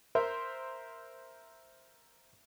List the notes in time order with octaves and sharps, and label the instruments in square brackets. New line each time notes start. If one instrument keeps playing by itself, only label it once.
[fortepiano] A#4 C5 E5